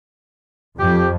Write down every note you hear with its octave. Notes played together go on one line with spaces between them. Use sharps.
F2 G4